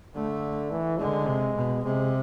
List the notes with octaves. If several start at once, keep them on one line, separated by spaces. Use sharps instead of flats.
D3 A3
E3
D3 G#3
C3
B2
C3 G#3